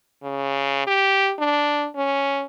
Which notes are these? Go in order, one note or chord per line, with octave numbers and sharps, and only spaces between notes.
C#3
G4
D4
C#4